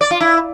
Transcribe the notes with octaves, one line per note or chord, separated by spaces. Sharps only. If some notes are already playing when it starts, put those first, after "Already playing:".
D5
F4
E4